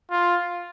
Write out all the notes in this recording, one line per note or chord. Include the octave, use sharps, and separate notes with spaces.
F4